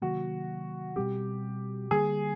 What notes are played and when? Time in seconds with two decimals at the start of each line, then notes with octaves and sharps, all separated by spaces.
0.02 C3 D#3 F#3 A#3 F#4
0.96 B2 G3 C4 G4
1.91 D3 G3 A#3 G#4